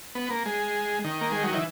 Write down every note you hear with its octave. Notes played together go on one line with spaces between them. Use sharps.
B3
A#3
G#3
D#3
A#3
G#3
F#3
E3